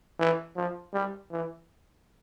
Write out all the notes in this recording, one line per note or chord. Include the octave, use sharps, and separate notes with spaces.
E3
F3
G3
E3